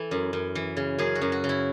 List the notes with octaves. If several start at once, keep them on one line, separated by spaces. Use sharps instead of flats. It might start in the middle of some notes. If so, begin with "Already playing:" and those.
Already playing: E3 A4
F#2
F#2
E3
C#3
F#2 G#4
F#4
F#2
F#4
C#3
E4